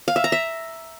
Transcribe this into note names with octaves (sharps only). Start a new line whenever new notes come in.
F5
E5
A#5
E5